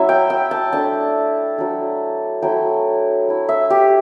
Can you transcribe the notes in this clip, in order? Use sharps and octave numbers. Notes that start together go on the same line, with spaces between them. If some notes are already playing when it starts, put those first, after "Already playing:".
Already playing: F#3 C#4 E4 E5
G5
G5
A5
A3 D4 A5
F#3 A3 D4
F#3 A3 E4 G5
A3 E4
E5
G4